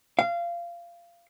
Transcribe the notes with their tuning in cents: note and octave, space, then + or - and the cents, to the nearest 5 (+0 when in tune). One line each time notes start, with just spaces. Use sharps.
F5 -20